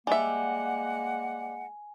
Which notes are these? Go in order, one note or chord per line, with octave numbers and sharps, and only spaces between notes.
G3 G#3 A#3 E5 F#5 G#5